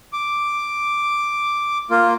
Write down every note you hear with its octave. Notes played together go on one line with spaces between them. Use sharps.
D6
A#3 F4